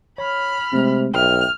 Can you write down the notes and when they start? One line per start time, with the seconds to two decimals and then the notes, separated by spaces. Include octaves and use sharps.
0.18 C#5 B5 F6
0.73 C3 G#3 A3 C4
1.14 B1 E5 G5 F6